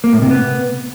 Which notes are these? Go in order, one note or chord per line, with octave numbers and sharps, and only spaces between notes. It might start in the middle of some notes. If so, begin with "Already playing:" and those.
A#3
A2
C3
B3